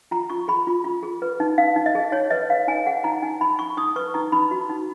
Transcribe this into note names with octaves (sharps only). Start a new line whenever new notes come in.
F4 A#5
F4 C#6
G#4 B5
F4
F4
G#4
B4
D#4
D#4 F5
D#4
D#5
G#4
D#4 C#5
B4 D#5
D#4 F5
D#4 G#5
G#4 F#5
D#4 A#5
D#4 G#5
D#4 B5
D#4 C#6
D#4 D#6
B4 C#6
D#4 A#5
D#4 B5
F#4
D#4